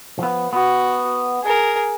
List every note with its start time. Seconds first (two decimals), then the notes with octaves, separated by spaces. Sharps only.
0.19 F3 B3
0.53 B3 F#4
1.43 G#4 A#4